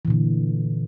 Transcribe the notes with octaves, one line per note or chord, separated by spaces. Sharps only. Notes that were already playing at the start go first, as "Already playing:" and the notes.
A#2 D3 E3